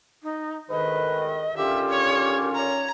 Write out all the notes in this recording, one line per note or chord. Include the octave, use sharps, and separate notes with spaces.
D#4
D2 G#2 D#3 B4 D#5
D3 D#3 C#4 F4 G4 E5
C#5
C#5 A#5